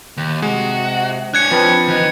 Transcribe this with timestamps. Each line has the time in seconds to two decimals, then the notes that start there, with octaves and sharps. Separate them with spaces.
0.17 D#2
0.42 C3 G#3 F#4
1.34 D4 C#5 F#6 G#6 C#7
1.51 F3 C4 B4
1.88 E2 D#4